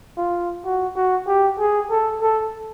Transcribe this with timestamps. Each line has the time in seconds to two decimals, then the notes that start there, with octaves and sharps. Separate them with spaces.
0.17 F4
0.65 F#4
0.96 F#4
1.27 G4
1.59 G#4
1.90 A4
2.21 A4